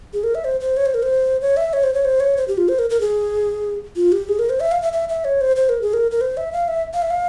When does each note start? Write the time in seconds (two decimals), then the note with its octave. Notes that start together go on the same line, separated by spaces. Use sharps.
0.13 G#4
0.24 A#4
0.35 E5
0.45 C5
0.61 C5
0.77 C#5
0.86 C5
0.94 A#4
1.03 C5
1.41 C#5
1.57 E5
1.73 C#5
1.83 C5
1.94 C#5
2.05 C5
2.20 C#5
2.37 C5
2.48 G4
2.58 F4
2.69 C5
2.79 A#4
2.90 A#4
3.01 G#4
3.96 F4
4.12 G4
4.29 G#4
4.39 A#4
4.50 C5
4.60 E5
4.71 F5
4.82 E5
4.93 E5
5.09 E5
5.25 C#5
5.41 C5
5.56 C5
5.69 A#4
5.82 G#4
5.94 A#4
6.11 A#4
6.21 C5
6.37 E5
6.53 F5
6.68 E5
6.94 F5
7.02 E5
7.10 F5